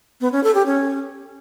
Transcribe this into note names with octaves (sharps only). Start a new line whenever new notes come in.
B3
C#4
A4
G4
C#4